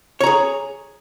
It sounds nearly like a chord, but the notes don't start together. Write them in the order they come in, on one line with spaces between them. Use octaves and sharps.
C#5 A#5 G#4